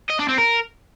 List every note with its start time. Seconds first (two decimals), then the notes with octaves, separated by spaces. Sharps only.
0.10 D#5
0.19 D4
0.29 C4
0.38 A#4